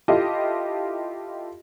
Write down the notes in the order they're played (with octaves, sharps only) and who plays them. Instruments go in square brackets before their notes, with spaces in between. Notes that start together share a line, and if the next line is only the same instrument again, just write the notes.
[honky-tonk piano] E4 F4 G4 A4 D#5